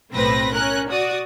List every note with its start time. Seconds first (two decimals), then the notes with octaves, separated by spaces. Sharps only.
0.13 B1 A2 C4 B4 A#6
0.54 C#4 A#4 F#6
0.90 F#4 D5 D#6